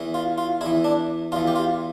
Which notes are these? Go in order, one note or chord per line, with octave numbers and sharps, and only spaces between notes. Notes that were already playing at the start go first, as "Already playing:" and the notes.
Already playing: E2 E3
F4
F4
E2 E3 E4
D4
E2 E3 F4
G4
F4